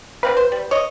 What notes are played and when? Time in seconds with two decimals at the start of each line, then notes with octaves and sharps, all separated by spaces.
0.23 D3 C4 B4 F5
0.37 C5
0.52 G3
0.71 C#5 D#5